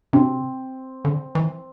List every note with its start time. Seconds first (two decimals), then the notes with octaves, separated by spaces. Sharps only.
0.13 C3 C4
1.05 D3
1.35 E3